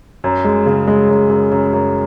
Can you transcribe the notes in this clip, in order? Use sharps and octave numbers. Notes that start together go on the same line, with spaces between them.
F#2
G#3
C#3
G#3
F#2
F#2
F#2
F#2